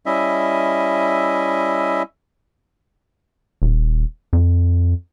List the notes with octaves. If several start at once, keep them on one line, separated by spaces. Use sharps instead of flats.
G3 C#4 E4 D#5 E5
D#1
F2